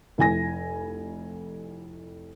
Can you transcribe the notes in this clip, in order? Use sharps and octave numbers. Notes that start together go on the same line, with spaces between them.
F1 E4 G#5 A#6